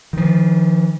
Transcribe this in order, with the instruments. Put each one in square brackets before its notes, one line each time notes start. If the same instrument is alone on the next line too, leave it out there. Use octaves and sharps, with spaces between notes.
[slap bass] D#3 F3